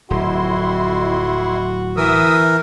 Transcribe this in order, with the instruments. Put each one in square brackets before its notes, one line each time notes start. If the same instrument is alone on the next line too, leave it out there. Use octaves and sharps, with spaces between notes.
[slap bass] D1 F#3 [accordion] F2 E4 C6 [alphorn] F#4
[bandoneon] E3 A#4 [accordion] E5 D#6 E6